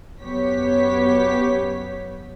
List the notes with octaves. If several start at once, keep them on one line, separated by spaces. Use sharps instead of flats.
F#2 B3 G4 C#5 B6